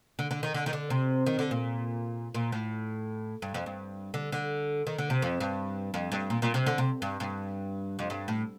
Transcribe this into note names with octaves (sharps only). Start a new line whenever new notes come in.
D3
D3
D#3
D3
D#3
D3
C3
D#3
D3
A#2
A#2
A2
G2
F2
G2
D3
D3
D#3
D3
C3
F2
G2
F2
G2
A#2
A#2
C3
D3
C3
G2
G2
F2
G2
A2